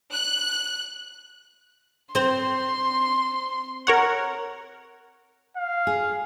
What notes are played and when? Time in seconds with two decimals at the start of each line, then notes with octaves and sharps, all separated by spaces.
0.12 F#6
2.15 C4 C5 C6
3.87 A#4 C#5 F#5
5.57 F5
5.87 G#4